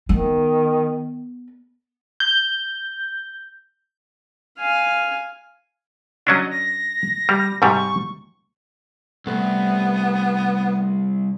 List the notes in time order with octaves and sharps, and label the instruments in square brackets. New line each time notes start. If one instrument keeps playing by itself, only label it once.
[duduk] D#3 [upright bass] B3
[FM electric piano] G6
[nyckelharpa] F5 G#5
[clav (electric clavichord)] F#3 C#4 D4 [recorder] D#5
[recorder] A#6
[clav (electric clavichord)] G3
[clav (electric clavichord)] G#2 C3 G3 [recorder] C#6
[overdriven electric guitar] C2 [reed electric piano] A3 [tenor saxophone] B3